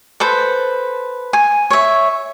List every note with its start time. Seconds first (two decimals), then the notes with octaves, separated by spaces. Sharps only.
0.20 A4 B4 C5
1.33 G#5
1.70 C#5 E5